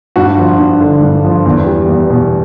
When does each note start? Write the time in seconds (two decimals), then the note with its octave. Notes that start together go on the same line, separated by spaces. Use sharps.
0.16 G2 F#4
0.38 F3
0.59 G2
0.81 D3
1.02 G2
1.24 F3
1.45 E2
1.66 G3
1.89 E2
2.10 B2